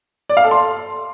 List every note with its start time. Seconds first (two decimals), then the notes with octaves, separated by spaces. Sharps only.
0.29 D5
0.37 F5
0.44 A4
0.51 C6